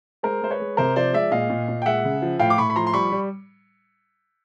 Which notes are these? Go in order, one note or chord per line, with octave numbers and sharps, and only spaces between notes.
G#3 A#4 C5
G#3 C5
B4 C#5
G#3
C3 A#4 C5
F3 C5 D5
G#3 D5 E5
A#2 D#5 F5
A#2
A#2
G5
G#3 E5 F#5
C#3
F3
A2 F5 G5
D6
A2 B5 C#6
B5
F3 A#5 C6
C6
G3 B5 C#6
G3